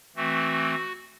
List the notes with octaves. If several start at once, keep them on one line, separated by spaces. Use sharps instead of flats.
E3 A3 C4 F#4